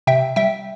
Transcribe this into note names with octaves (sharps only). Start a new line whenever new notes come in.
C3 E5 G5
G3 E5 G5